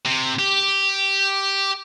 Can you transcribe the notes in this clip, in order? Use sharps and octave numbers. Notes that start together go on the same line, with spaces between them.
C3
G4